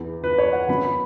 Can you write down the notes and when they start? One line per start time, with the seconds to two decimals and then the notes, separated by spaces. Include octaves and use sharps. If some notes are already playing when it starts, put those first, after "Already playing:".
Already playing: E2 E3 B3
0.24 B4
0.38 C#5
0.53 F#5
0.68 F#2 F#3 B3 B5
0.85 B5